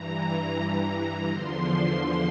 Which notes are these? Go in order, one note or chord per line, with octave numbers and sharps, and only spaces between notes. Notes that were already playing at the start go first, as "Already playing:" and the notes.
Already playing: G2 E3 A#5
A#5
E2 D3 F3 C6